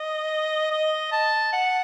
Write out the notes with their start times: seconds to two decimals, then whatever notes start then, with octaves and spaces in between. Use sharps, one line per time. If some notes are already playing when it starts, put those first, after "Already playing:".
Already playing: D#5
0.71 D#5
1.12 A5
1.53 F#5